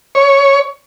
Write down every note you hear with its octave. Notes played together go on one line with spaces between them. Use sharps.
C#5